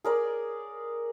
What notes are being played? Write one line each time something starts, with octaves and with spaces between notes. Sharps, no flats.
G#4 A#4 D5